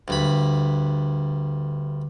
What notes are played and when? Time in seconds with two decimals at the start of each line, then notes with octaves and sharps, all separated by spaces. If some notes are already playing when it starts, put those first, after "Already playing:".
0.08 D2 G2 B5